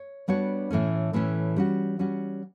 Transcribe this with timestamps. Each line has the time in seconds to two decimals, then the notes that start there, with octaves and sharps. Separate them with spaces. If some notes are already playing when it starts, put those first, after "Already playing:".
Already playing: C#5
0.28 G3 B3 D4 F#4 C#5
0.71 A2 E3 A3 C#4
1.13 A2 E3 A3 C#4
1.56 G3 C#4 F#4
1.99 G3 C#4 F#4